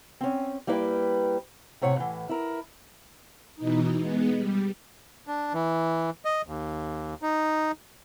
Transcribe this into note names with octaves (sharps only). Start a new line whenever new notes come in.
C4 C#4
G3 A#3 E4 B4 F#5 G5
A2 C3 C#5 F#5
A2 E3
E4 A#4
B2 E3 D#4
G#3 B3
G3
D4
E3
D#5
D#2
D#4